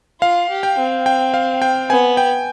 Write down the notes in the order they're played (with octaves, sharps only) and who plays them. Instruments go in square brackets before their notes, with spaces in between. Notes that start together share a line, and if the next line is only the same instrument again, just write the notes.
[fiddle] F4 [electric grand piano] F5
[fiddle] G4
[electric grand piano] G5
[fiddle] C4
[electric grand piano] G5
F5
G5
[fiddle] B3 [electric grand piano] G#5
[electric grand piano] G5